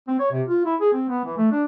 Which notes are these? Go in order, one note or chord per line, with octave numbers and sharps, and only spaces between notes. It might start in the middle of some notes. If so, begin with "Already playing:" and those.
C4
C#5
C3
F4
E4
G#4
C4
B3
E3
A3
D4